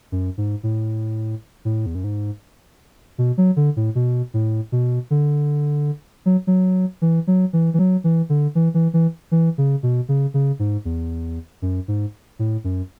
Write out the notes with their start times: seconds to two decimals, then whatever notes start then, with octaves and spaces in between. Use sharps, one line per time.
0.12 F#2
0.38 G#2
0.63 A2
1.65 A2
1.86 E2
1.95 F#2
2.04 G#2
3.18 B2
3.38 F#3
3.56 D3
3.76 A2
3.95 B2
4.34 A2
4.72 B2
5.10 D3
6.26 F#3
6.47 F#3
7.02 E3
7.27 F#3
7.53 E3
7.74 E3
7.79 F#3
8.04 E3
8.29 D3
8.55 E3
8.74 E3
8.94 E3
9.31 E3
9.58 C#3
9.83 B2
10.09 C#3
10.34 C#3
10.59 G#2
10.85 E2
11.62 F#2
11.88 G#2
12.39 A2
12.64 F#2